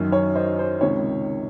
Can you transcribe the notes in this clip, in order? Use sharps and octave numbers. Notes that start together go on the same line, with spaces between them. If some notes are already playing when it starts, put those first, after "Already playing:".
Already playing: F#2 D#3 F#3
C#5
C5 D#5
C5
C#2 C3 D#3 C#5